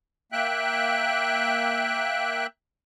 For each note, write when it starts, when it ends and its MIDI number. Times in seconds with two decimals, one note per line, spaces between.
0.32 2.47 58
0.32 2.47 76
0.32 2.47 79
0.32 2.47 90